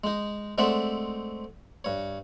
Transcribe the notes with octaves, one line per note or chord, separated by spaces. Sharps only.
G#3 D#4
G#3 A3 C4 D5 E5 F#5
G2 C#5